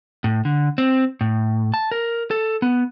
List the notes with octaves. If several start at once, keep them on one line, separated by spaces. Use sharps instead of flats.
A2
D3
C4
A2
A5
A#4
A4
B3